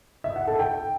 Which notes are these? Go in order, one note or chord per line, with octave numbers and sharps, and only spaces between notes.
E5
F#5
A4
G5